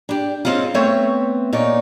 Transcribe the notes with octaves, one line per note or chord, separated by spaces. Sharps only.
D4 G4
G#3 C4 C#4 D#4 F4
A3 B3 C4 C#5 E5
A#2 D#4 C#5 D5